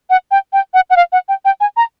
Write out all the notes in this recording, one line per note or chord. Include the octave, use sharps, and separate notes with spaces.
F#5
G5
G5
F#5
F#5
F5
F#5
G5
G5
G#5
A#5